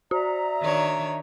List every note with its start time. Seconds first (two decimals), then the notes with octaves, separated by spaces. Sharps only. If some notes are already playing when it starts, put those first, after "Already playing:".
0.11 F#4 D5 E5 A#5
0.60 D#3 D4 C#5